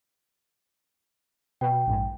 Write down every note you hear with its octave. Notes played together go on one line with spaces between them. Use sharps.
B2 G5
A#1 G#2